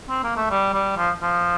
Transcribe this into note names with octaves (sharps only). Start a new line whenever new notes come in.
C4
A#3
A3
G3
G3
F3
F3